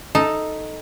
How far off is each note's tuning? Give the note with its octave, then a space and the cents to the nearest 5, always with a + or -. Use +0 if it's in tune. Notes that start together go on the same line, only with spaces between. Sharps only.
D#4 +0 A4 +0